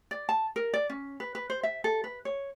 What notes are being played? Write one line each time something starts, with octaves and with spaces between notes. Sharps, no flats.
D5
A5
A#4
D5
C#4
B4
B4
C5
E5
A4
B4
C#5